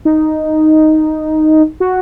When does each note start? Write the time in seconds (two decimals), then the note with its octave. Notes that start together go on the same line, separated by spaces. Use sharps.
0.05 D#4
1.80 F#4